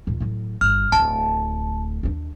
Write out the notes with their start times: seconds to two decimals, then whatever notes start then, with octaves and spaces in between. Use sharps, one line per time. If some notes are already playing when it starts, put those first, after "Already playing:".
0.07 D#2 A#2
0.20 A2 F#3
0.61 G1 F6
0.92 D1 D2 A5
2.03 D#2 D4